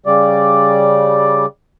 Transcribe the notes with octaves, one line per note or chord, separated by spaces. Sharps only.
C#3 G3 D5